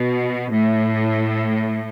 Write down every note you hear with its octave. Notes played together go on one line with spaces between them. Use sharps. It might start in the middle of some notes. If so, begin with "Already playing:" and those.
Already playing: B2
A2